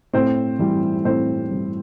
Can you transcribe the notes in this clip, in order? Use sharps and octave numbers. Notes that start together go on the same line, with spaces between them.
A2 C4 C5
E3 G3
A2 C4 C5
E3 G3